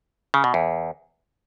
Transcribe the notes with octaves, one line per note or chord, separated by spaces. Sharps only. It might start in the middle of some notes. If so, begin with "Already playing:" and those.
C#3
B2
E2